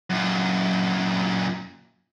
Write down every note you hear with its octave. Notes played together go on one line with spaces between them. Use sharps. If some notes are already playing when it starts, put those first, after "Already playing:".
F#2 A#2